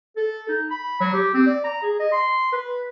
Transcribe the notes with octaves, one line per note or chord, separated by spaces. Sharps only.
A4
D#4
B5
F#3
G4
C4
D5
A#5
G#4
D#5
C6
B4